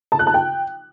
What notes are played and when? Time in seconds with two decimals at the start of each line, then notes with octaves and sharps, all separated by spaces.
0.12 A5
0.19 F#6
0.27 A5
0.34 G5